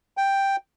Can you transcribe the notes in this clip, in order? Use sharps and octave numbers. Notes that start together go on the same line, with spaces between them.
G5